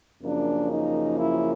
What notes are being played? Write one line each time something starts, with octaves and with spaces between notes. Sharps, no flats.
F#2 C#3 F3 A#3 D4
D#4
E4